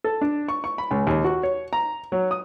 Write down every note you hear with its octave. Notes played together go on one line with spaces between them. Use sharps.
A4
D4
C#6
C#6
B5
C#2
D#2
F#4
C#5
A#5
F#3
D#6